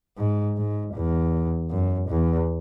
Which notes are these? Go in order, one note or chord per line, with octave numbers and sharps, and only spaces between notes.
G#2
G#2
E2
F#2
E2